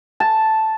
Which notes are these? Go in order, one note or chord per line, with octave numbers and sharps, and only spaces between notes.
A5